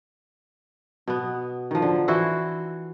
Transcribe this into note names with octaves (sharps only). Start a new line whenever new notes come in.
B2 B3
D#3 F3
D3
E3 E4 F#4 C5